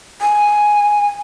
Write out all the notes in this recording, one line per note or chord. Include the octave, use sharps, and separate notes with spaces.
G#5